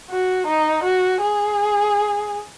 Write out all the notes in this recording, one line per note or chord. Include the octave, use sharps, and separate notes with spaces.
F#4
D#4
F#4
G#4